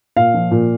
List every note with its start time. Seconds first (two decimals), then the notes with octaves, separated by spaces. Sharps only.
0.16 A#2 F5
0.34 F3
0.51 A#2